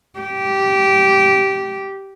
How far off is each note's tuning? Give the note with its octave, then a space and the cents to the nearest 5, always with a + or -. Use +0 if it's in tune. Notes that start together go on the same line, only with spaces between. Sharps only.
G4 -15